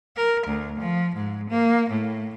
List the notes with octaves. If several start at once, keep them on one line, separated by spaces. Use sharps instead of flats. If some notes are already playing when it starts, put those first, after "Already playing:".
A#4
D2
F3
G#2
A#3
A2